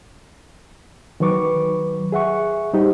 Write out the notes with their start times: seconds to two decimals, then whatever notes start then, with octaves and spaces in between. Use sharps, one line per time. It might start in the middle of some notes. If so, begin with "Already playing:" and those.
1.20 D#3 F#3 B4 C#6 D6
2.12 G#4 E5 F#5 C#6
2.73 G3 D#4 G4 C5